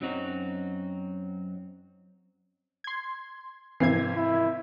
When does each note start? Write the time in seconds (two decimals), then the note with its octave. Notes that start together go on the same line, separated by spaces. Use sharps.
0.01 F#2 F#3 C4 D#4 F#4
2.84 C6 G#6
3.80 G#1 C3 E3 F3 G#6 C7
4.16 E4